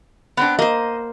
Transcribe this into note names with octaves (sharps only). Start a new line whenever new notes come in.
B3 C4 D4
A#3 C5 D#5